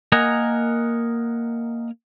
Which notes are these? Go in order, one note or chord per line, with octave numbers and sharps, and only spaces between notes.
A#3 A#4 D#5 F#5 G#5 A#5